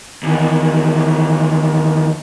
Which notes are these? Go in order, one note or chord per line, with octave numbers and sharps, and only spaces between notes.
D#2 E3